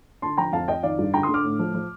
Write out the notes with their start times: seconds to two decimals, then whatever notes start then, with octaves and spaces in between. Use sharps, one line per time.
0.22 D3 A5 C6
0.37 F3 G5 A#5
0.52 F2 F5 A5
0.68 F2 D#5 G5
0.83 D#3 D5 F5
0.99 G2
1.14 D3 G5 A#5
1.23 C6 D#6
1.29 D3
1.34 D6 F6
1.44 A2
1.59 F3
1.75 F3